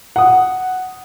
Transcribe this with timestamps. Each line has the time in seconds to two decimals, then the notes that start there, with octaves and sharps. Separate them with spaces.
0.16 F#5 D#6